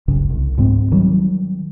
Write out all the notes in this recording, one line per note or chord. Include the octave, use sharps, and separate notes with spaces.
F#1 C#2 C#3
C2
C#2 G#2 G#3 C4
D#3 F#3 G3